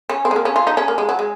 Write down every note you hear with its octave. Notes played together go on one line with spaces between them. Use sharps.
C#4
C4
G#3
A#3
C#4
F4
D#4
C#4
A#3
G#3
F#3
G#3